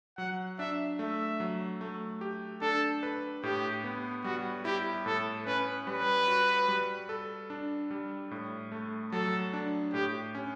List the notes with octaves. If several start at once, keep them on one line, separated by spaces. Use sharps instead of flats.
F#3 F#5
D4 E5
A3 E5
F#3
A3
G4
D4 A4
B4
A2 G4
B3
G3 F#4
E4 G4
A2 A4
C#4 B4
G3 B4
F#4
G3
A4
D4
G3
A2
A3
F#3 A4
D4
A2 G4
C#4